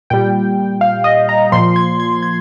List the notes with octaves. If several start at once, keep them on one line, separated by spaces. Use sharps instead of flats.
A#2 G3 G5
F5
D#5
A#5
A#2 F3 C6
G#6
G#6
G#6